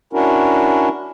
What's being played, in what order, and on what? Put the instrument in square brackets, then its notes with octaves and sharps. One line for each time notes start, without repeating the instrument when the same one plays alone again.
[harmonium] C#4 D4 E4 F#4 A#4